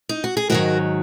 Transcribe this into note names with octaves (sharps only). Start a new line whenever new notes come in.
D#4
F#4
G#4
G#2 D#3 F#3 F#4 A#4